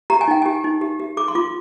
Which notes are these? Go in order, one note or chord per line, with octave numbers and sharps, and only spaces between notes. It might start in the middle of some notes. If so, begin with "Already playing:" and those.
G4 A#5
G#5
D#4 G5
G4 G#5
D#4
G4
G4
G#4 D6
C6
F4 D6